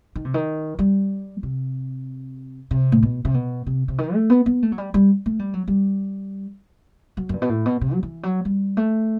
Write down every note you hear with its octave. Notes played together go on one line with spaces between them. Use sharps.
D#3
C3
D#3
G3
C3
C3
A2
B2
C3
B2
C3
C3
D#3
A3
B3
B3
A3
F#3
G3
G3
A3
G3
F#3
G3
F#3
F#2
G2
B2
A2
B2
C3
F#3
E3
F#3
G3
A3